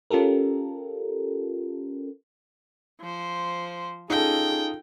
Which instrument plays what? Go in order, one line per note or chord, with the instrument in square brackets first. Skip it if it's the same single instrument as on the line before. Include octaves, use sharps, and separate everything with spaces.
[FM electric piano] C#4 F4 G4 A4 A#4
[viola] F3 C5
[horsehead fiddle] C#4 G#4 [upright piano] D#4 F4 A4 [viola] G5